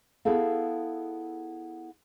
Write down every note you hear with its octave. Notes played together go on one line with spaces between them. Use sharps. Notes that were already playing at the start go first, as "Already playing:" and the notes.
B3 E4 G#4 A4 F5